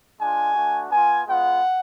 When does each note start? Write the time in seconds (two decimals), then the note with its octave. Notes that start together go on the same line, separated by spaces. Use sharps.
0.19 G#3 D4 F4 G#5
0.54 A3 D4 F#4
0.90 B3 F4 G#5
1.26 G#3 B3 F4 F#5